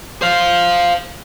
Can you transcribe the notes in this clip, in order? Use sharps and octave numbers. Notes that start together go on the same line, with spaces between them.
C5 F5